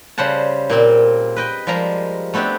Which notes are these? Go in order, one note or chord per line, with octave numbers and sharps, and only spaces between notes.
C#3 G3 C5 F#5 A5
A#2 A#3 C4
B4 D#5 G5
F3 G3 G#3 A#4 A#5
A3 B3 C4 D4 G4